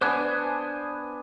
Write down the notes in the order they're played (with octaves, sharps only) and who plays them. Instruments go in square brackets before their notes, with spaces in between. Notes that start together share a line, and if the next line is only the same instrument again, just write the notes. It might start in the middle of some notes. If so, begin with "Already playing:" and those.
[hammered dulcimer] B3 D4 G#5 [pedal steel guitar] C5 D6 F#6